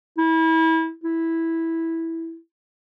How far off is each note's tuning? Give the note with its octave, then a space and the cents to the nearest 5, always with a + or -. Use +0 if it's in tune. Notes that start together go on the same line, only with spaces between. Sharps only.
E4 -30
E4 -5